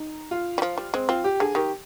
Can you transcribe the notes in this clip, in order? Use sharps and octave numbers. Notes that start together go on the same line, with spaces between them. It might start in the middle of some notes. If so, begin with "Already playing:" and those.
Already playing: D#4
F4
G3
F3
G3
G#3 C4
C4 F4
G4
D3 G#4
D#3 G4